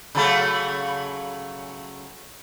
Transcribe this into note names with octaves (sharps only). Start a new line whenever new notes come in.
C#3 F#3 A3